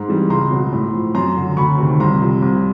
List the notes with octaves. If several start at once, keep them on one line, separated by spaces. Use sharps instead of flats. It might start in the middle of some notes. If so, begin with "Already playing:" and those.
Already playing: G#2 C6
E3 G3
C#2 A#5 C6
B2 F#3
A2
F3
F#2 A#5 C6
D3 F#3
D2 B5 C#6
C3 D#3
C2 A#5 C6
C3 F3
C2